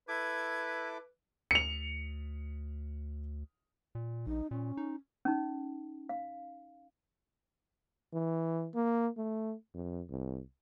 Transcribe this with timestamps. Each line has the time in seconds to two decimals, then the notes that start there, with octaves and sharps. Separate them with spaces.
0.08 E4 A4 B4 D6 G#6
1.51 D2 C#7 F7
3.95 A#2
4.27 A#1 D#4
4.51 A#2 C#4
4.77 D#4
5.25 C#4 D#4
6.09 F5
8.13 E3
8.75 A#3
9.17 A3
9.74 F2
10.10 C2